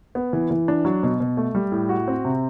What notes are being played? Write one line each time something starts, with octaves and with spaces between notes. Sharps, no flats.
B3
E3
E3
D4
F#3
B2
B2
A3
G3
A2
F#4
C4
C3